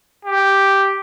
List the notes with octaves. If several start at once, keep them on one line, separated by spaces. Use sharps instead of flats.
G4